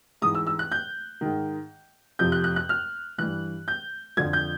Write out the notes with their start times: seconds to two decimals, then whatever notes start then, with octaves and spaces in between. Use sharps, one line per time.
0.22 G#2 E3 D#6
0.35 E6
0.47 E6
0.59 F#6
0.72 G6
1.21 G#2 D#3
2.19 F2 C3 F3 G6
2.32 F#6
2.44 F#6
2.56 F#6
2.69 F6
3.18 G2 E3 F#6
3.68 G6
4.17 F2 D3 F3 G#6
4.33 G6